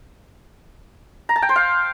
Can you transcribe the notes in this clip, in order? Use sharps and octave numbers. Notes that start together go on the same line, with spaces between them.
A#5
A5
G5
C5
F5